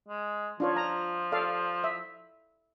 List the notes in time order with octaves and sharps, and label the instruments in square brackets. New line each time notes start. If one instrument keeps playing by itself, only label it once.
[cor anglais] G#3
[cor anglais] F3 [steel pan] D4 F4 C#5
[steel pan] A#5
A4 D5 F5
E5